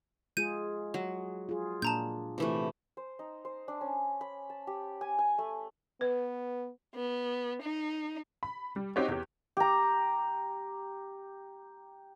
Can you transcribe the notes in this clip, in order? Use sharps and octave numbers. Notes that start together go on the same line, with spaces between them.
G#3 F4 G#4 G6 D#7
F#3
F4 G#4
A#2 A#3 D4 A5 A#5 G6
C3 E3 A3
C5
D#4
C5
D4
C#4
B5
A5
G4
G#5
G#5
A3
B3 B4
B3
D#4
B5
G3
C4 D#4 F#4 G4 C5 C#5
E2 G4
G4 A#5